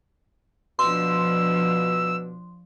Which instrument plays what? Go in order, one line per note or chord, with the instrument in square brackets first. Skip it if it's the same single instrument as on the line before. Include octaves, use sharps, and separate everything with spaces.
[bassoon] B2 [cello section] F3 D4 [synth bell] C6 [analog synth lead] E6